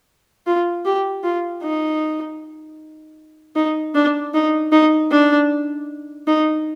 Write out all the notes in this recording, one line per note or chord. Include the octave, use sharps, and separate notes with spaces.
F4
G4
F4
D#4
D#4
D4
D#4
D#4
D4
D#4